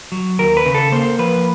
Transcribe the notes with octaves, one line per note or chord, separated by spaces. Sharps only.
F#3
D#2 A#4
B4
C#3
A4
A#3 C5
F3 B4